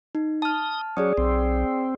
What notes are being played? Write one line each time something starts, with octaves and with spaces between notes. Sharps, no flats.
D#4
A5 D#6 F6
F#3 C#4 G#4 D5 D#6
B1 C4